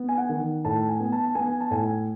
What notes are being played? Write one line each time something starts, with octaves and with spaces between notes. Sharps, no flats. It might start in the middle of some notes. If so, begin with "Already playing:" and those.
Already playing: B3
G#5
F#5
D#3
A2 A5
G#5
B3
A5
B3 G#5
A5
A2 G#5